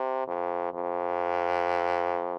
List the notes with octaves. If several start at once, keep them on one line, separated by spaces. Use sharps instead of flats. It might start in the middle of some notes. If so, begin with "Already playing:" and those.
Already playing: C3
F2
F2